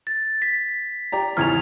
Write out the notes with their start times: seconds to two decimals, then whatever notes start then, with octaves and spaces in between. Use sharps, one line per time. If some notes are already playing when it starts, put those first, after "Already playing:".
0.07 A6
0.42 B6
1.12 G4 D5 A#5
1.37 G#1 E2 C#3 F6 G#6 F7